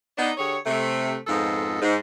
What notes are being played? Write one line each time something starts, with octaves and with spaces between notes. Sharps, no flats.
B3 D4 D#4
D3 G4 G#4 C#5
C3 A3
F2 G#2 B3 F4 A4 D#5
G#2